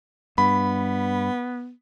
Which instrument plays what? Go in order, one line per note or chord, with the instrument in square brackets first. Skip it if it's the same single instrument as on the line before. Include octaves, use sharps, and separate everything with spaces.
[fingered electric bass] G2 [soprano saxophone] B3 [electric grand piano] B5